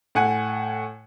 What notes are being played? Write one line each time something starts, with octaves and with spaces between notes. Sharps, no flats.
A2 F#5 G#5